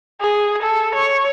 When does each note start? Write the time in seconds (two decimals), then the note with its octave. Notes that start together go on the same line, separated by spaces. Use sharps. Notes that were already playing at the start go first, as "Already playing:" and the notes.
0.21 G#4
0.62 A4
0.95 C#5